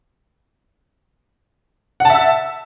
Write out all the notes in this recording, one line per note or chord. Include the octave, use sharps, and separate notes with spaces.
E5 F#5 A5 E6